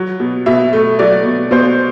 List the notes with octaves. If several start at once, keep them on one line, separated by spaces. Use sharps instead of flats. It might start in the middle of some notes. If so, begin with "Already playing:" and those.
Already playing: F#3
B2
B2 E5
A3
F#3 D5
B2
B2 C5